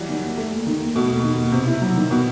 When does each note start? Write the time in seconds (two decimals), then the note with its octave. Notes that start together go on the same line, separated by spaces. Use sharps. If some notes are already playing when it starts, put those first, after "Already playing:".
Already playing: E3 F#3 G3
0.09 D#3
0.23 D#2
0.37 A3
0.51 D#2
0.67 D#3
0.80 D#2
0.95 B2 A3
1.09 D#2
1.23 D#3
1.38 D#2
1.52 C3 B3
1.67 E4
1.82 F#3
1.96 D#3
2.11 B2 B3